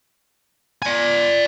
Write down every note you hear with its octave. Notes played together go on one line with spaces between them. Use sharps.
D5 G#5